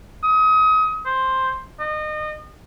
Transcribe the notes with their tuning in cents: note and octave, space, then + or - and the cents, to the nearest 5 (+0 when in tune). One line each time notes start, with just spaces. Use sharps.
D#6 +30
C5 +5
D#5 -30